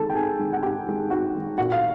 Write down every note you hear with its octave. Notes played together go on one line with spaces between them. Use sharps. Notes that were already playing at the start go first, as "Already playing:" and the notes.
Already playing: D#3 G#3 A4 A5
G5
G#2 G#4 G#5
D#3 G#3
F#5
G#2 G4 G5
D#3 G#3
G#2 F#4 F#5
D#3 G#3
A#2 F#4 F#5
F5